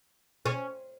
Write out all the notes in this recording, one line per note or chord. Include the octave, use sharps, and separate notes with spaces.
C#4